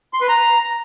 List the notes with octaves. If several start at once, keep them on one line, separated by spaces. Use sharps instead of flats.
C6
B4
A#5